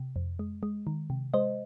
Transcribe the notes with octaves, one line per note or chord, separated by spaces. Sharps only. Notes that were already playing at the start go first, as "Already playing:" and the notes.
Already playing: C3
F2
G#3
G#3
D#3
C3
G#3 C5 D#5